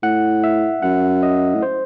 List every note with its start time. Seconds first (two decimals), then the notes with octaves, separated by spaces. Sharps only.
0.03 A2 F#5
0.44 E5
0.82 F#2 F#5
1.23 D#5
1.54 A2
1.63 C5